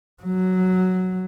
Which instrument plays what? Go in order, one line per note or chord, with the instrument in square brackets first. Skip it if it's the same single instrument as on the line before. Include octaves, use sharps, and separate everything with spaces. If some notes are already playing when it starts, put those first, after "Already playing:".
[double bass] F#3